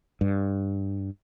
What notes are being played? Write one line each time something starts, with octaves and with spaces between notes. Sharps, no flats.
G2